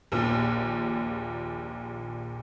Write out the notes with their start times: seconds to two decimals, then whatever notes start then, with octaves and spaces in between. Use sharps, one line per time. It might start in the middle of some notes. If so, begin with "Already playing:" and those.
0.12 A#1 D#2 A#2